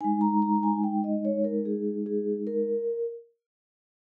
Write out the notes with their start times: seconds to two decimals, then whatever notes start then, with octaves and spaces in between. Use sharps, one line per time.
0.01 G#3 D#4 G#5
0.21 A#5
0.42 A#5
0.56 A#5
0.63 G#5
0.84 G5
1.04 D#5
1.25 C#5
1.44 A#4
1.65 G#4
2.06 G#4
2.47 A#4